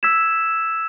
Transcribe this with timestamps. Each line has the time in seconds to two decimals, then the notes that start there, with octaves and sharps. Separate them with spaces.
0.03 E6 G#6 B6 E7